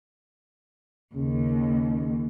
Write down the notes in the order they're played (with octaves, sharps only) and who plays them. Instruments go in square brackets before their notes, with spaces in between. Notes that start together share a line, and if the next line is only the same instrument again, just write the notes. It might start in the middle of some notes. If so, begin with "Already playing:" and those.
[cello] D#2 [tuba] C#3